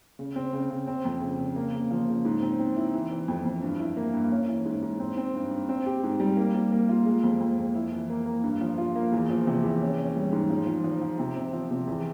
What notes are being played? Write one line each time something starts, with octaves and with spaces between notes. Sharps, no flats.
C#3
C4
C#3
C#3
C4
F2
C#3
C#3
A#3
C#3
F3
C#3
G#2
C4
C4
E4
E3
E3
F2
F2
G2
E4
A#3
G2
C#4
E3
G#2
G#2
C4
C4
G2
G2
C4
G4
G#2
G3
A#3
G3
A#3
F4
G#3
F2
F2
F2
E4
E3
A#3
A#3
G2
F3
F4
A#3
E2
F3
C3
E2
C#4
C#4
G3
G#2
F3
F3
F3
F3
C3
C4
F3
C3
E2